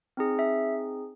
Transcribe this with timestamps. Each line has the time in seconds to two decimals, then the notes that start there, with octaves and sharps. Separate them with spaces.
0.17 C4 D#4 G#4
0.39 E5